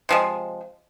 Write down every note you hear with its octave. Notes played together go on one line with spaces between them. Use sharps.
C3 F3 G#3